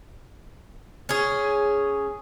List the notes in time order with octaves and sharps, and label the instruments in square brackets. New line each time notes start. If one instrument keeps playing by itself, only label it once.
[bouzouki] C#4 G#4